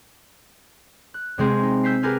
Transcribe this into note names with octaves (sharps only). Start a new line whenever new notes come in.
F#6
C3 G#3 C4 G#4
D#4
E6 G6 B6 C7
G4 G#4 A#4 B4 G#5 F6